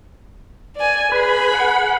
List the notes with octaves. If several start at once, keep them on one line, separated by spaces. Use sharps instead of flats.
D5 G#5
G#4 B4 B5
F#5